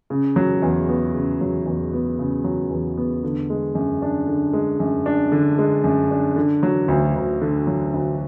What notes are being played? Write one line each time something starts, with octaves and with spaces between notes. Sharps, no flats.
C#3
F#3
E2
B3
C#3
F#3
E2
B3
C#3
F#3
E2
B3
D3
G#3
F#2
D4
D3
G#3
F#2
D4
D3
G#3
F#2
D4
D3
F#3
D2
D2
D3
F#3
D2